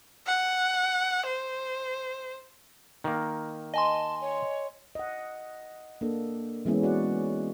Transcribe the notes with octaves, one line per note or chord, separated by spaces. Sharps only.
F#5
C5
D#3 A#3
D#5 G#5 A5 C6
C#5
D#5 F#5
A#3 D4 A4
E3 G#3 B3 C#4 E4
F#4 D5 F#5